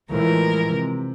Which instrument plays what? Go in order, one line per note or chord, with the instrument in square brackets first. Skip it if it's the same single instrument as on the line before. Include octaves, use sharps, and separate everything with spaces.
[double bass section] A2 E3 F3 [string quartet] G#3 A#4
[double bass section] C3